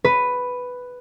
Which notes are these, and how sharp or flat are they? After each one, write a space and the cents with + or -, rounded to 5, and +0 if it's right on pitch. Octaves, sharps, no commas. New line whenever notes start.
B4 +5